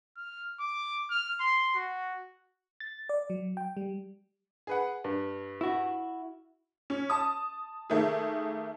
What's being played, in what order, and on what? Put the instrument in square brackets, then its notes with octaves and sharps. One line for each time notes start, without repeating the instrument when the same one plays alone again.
[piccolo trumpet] F6
D6
F6
C6
F#4
[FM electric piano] A6
D5
F#3
G5
G3
[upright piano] G#4 B4 F#5
G2
[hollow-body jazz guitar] E4 F#4
[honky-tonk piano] C#4
A5 D#6
D#3 A3 A#3 G#4